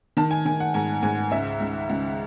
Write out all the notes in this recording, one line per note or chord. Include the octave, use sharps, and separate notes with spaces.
D#3 A5
G#5
D#3 G#5
F#5
G#2 G#5
G#2 G#5
C#2 E5
C#2
C#2